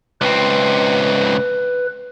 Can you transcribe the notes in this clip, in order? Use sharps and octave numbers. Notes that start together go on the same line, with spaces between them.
C#2 C4 B4